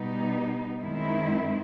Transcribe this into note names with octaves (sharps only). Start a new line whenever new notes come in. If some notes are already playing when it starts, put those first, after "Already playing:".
Already playing: B2 G3 B3 D#4
F#2 D#3 G#3 C4 E4